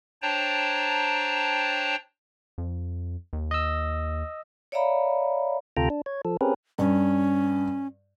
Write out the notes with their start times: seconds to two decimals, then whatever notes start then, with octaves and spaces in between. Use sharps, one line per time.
0.22 D4 C5 C#5 G5 A5 A#5
2.58 F2
3.33 D#2
3.51 D#5 E6
4.72 C#5 D5 E5 F5 A#5 B5
5.77 D2 C3 F4 A4 G5 A#5
5.90 D4
6.06 C#5
6.25 F3 A4
6.41 C4 C#4 G4 G#4 A#4 B4
6.79 G2 C#4